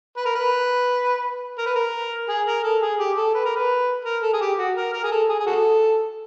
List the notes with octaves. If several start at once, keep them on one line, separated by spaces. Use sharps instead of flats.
B4
A#4
B4
A#4
B4
A#4
G#4
A#4
A4
G#4
G4
A4
B4
A#4
B4
A#4
A4
G#4
G4
F#4
A#4
A#4
G#4
A4
G#4
G#4
F#4 A4